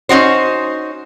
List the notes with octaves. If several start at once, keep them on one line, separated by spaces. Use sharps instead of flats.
C#4 D#4 F#4 C5